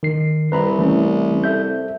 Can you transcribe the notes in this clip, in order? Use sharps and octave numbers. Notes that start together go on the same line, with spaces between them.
D#3 C7
C2 B4 A#5 B5
E3 A3 C#4
A4 E5 G6